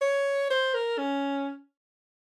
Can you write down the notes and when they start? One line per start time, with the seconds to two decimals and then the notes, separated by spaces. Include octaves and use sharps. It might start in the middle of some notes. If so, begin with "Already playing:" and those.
0.01 C#5
0.50 C5
0.74 A#4
0.98 C#4